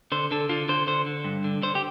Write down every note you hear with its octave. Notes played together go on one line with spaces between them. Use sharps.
D3 C5
D3 A4
D3 F4
D3 C5
D3 C5
D3
G2
D3
D3 C5
G4